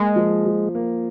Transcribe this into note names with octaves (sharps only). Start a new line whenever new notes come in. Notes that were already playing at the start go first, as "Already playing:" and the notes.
Already playing: G#3 A#3
F3
F3
A#3